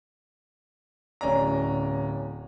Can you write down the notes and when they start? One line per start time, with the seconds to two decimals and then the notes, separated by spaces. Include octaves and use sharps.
1.21 D1 C#4 D5 A#5